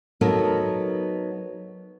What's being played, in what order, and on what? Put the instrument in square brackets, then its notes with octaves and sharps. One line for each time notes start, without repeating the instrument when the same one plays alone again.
[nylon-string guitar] F#3 B3 D#4 A4 A#4